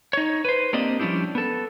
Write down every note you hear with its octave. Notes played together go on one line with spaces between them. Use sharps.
D#4 C#5
B4 C5
A#3 C4 D4 G4 D5 D#5
F3 G3 C#4 D4 E4 G4
B3 A4